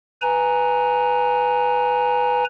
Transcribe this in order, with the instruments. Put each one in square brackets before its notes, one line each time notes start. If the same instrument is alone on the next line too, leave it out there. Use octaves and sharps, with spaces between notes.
[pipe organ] B4 G#5 A#5